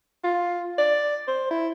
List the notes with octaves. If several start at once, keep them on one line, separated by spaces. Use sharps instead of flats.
F4
D5
C5
E4